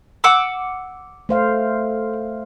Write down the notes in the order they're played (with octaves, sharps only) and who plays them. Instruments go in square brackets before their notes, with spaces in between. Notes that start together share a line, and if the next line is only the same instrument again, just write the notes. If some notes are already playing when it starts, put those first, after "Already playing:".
[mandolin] F#5 D6 E6
[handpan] A3 C5 F5